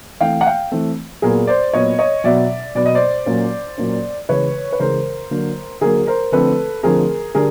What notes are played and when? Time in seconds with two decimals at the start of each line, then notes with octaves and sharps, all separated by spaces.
0.21 E3 A3 C4 F5 G5
0.41 F#5
0.47 F5 G5
0.72 E3 A3 C4
1.22 A#2 F#3 B3 G#4 A#4
1.47 C5 D5
1.73 A#2 F#3 B3 C#5 D#5
1.98 C#5 D#5
2.24 B2 F#3 B3 D5 E5
2.75 B2 F#3 B3 D5
2.86 D#5
2.95 C5 D5
3.26 A#2 F#3 A#3 C#4
3.78 A#2 F#3 A#3 C#4
4.29 C#3 E3 G#3 B4 C#5
4.72 B4
4.80 C#3 E3 G#3 A#4 C5
5.31 D3 F#3 A#3
5.81 D3 F#3 A#3 G#4 A#4
6.07 A#4 C5
6.32 D3 F3 A3 C4 A4 B4
6.83 D3 F3 A3 C4 G#4 A#4
7.35 D3 G3 G#4 A#4